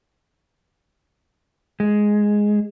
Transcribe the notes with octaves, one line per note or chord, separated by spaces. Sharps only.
G#3